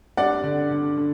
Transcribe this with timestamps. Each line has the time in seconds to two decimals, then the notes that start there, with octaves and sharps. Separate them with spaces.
0.17 G2 D5 F#5
0.43 D3
0.71 D3
0.97 D3